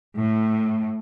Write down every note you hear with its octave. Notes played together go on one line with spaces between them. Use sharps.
A2